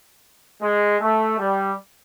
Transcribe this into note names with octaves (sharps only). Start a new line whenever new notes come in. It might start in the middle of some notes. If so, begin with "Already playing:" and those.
G#3
A3
G3